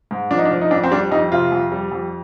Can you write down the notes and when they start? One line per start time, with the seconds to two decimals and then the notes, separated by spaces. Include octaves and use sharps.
0.11 G#2
0.31 F3 D4
0.38 D#4
0.45 D4
0.51 F3
0.61 D#4
0.71 F2 D4
0.84 C4
0.91 G3 D4
1.11 F2 D#4
1.31 C3 F4
1.52 F2
1.72 G3
1.92 F2